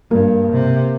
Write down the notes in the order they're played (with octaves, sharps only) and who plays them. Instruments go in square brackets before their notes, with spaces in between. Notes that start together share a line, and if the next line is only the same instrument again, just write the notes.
[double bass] G2 [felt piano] A#3
[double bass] C3